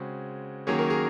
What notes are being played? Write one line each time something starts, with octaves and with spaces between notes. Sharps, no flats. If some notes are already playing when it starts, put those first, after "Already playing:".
Already playing: C#3 G#3 C4 F#4
D#3 F#3 A#3 C#4 G#4
A#4
G#4